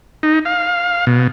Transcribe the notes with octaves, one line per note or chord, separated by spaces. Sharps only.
D#4
F5
B2